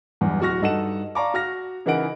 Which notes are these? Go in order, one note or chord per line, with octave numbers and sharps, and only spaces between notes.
B1 E2 G2
D1 F#3 F#4 C#6 F6 A#6
G2 D#4 A4 F#5 E7
D5 F5 A5 A#5 C#6 D6
F#4 F6 A#6
C#3 E3 D#4 A#4 F#5 D7